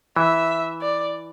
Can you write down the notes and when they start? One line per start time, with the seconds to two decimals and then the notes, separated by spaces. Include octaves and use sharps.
0.16 E3 E5
0.81 D5